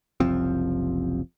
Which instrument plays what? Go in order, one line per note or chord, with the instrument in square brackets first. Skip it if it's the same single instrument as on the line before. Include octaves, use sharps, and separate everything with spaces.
[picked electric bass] F#1 C2 F3 C4